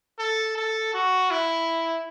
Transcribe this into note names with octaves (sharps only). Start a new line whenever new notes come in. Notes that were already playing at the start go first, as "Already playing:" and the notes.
A4
A4
F#4
E4